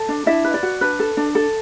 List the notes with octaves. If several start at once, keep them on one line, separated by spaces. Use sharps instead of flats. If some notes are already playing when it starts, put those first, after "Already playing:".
Already playing: A4 A5
D4
D4 E4 E5
B4
D5
F#4
D4 B4
A4
D4
A4